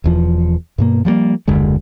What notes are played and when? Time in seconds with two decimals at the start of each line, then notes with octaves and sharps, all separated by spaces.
0.04 E1 E2 F3
0.78 G2 B2 A#3
1.05 F3 G3 G#3 A#3
1.48 F#1 D#2 D3 G#3